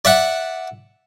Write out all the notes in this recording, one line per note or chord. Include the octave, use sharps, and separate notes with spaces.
D5 E5 F#5